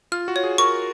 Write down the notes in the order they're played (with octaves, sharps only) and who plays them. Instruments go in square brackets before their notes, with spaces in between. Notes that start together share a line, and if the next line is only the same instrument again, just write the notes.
[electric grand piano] F4 [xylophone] F6
[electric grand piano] F#4
[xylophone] C#5
[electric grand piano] G#4
[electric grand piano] A#4 [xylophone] C#6